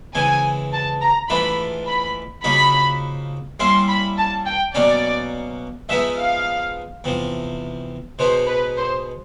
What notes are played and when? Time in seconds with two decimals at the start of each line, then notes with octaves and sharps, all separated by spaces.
0.14 C#3 E3 G#3 C4 G#5
0.73 A5
1.02 A#5
1.29 G#2 E3 A3 D4 F4 B5
1.87 B5
2.44 C#3 F3 A#3 D#4 F#4 B5
3.60 G3 A#3 C#4 E4 C6
3.88 B5
4.17 A5
4.46 G5
4.75 B2 F#3 A#3 C#4 D5
5.89 F3 G#3 B3 D#4 E5
6.18 F5
7.04 E2 C3 F3
8.19 B2 G#3 B3 D#4 C5
8.47 B4
8.77 C5